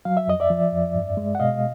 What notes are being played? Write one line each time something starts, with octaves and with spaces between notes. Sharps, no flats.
F#3 F5
E5
F2 D#5
D5 E5
F3
F2
G2
G#3
F#5
B2 D#5 F5